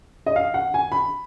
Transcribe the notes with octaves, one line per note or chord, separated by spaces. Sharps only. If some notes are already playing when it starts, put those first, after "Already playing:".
D#5
F5
F#5
G#5
B5